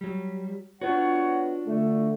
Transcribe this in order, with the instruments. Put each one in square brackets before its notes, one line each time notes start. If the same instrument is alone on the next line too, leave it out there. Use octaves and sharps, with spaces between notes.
[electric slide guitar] F#3 G3
[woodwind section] B3 C#5 F#5 [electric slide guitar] D4 F4 F#4
[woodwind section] D3 A3